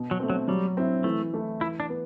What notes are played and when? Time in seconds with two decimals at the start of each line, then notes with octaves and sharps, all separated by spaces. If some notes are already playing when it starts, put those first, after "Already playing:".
Already playing: B2
0.11 F#3
0.20 A3 C4
0.30 F#3
0.48 F#3 G3
0.77 C4 E4
1.04 E3 A3
1.33 A3 E4
1.61 E3 E4
1.80 D4
1.90 B3